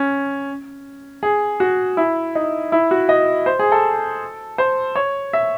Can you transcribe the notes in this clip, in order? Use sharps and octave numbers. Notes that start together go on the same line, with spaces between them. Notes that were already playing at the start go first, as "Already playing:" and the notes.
Already playing: C#4
G#4
F#4
E4
D#4
E4
F#4
D#5
C5
G#4
A4
C5
C#5
E5